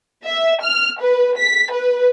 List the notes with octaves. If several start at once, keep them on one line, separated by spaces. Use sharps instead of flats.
E5
F6
B4
B6
B4